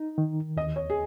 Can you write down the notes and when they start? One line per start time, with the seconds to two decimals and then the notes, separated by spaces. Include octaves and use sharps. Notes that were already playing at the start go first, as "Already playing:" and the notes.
Already playing: D#4
0.18 D#3
0.57 D#2 D#5
0.76 C#5
0.90 G#4